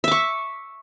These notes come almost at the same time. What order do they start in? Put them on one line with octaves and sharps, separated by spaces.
E5 D6 C#6